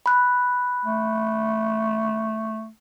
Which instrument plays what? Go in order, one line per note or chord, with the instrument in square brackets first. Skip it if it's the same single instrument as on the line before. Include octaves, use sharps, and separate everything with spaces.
[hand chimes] B5 F#6
[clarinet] A3